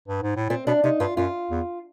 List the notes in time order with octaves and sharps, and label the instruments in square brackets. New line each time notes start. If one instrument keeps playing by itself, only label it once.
[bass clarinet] G2
G#2
A2
[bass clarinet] A#2 [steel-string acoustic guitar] C4
[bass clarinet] B2 [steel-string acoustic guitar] D4
[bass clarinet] C3 [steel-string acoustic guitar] D#4
[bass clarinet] G2 [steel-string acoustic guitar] F4
[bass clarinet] F#2 [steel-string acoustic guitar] F4
[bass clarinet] E2